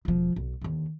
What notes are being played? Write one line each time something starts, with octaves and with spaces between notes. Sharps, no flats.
E1 F3
B1
D#2 D3